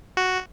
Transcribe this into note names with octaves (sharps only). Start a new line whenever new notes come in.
F#4